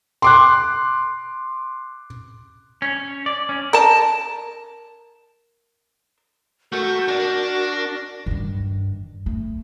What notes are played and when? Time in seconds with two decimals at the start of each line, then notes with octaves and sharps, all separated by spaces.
0.22 C6 D6 F#6
2.82 C#4
3.26 D5
3.49 C#4
3.73 A#4 A5
6.72 A3 F#4 A4 A#4 G6
7.08 D4 D5 A#6
8.26 G2 D#3
9.26 A3